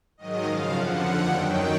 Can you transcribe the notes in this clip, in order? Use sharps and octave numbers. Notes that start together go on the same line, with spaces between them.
G#2 D#3 F#3 D#5
F#2 C#3 F3 F5
F2 D3 F3 F#5
D#2 D3 F3 F#5
F#2 D#3 F#3 G5